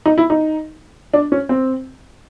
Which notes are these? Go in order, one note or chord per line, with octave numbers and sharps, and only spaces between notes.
D#4
E4
D#4
D4
C#4
C4